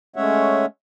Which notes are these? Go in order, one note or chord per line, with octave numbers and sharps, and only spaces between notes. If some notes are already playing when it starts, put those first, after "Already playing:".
G#3 A3 C#4 C#5 E5 F#5